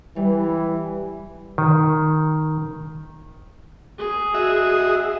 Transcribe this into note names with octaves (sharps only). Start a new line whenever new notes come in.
E3 G3
D#3
G#4
F#4 D#5 E5